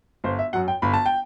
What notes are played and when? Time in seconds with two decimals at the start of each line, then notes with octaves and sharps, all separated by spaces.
0.24 G1 C5
0.39 E5
0.53 F#2 F#3 F#5
0.68 G5
0.82 G1 B5
0.94 A5
1.06 G5